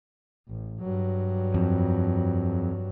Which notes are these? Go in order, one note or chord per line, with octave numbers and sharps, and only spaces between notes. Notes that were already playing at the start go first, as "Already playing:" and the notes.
A1
G2 F#3
F2